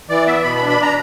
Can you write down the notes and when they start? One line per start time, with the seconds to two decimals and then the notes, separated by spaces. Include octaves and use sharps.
0.09 E3 D5
0.26 B3 E5
0.44 B2 B5
0.57 B5
0.61 D4
0.69 B5
0.82 A#5